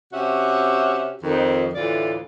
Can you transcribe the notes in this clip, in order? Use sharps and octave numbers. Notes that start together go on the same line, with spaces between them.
C3 C#4 F#4 G4 E5
F2 D#3
D2 A2 E3 E4 F4 D5